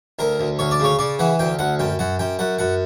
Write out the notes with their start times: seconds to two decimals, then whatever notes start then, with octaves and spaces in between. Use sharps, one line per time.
0.19 D2 A#4
0.39 D2
0.59 D2 C#5
0.71 D5
0.80 C#3 C#5
0.99 C#3 D5
1.19 E3 F#5
1.39 D2 G5
1.59 D2 F#5
1.79 F#2 G5
1.99 F#2 F#5
2.19 F#2 G5
2.39 F#2 F#5
2.59 F#2 F#5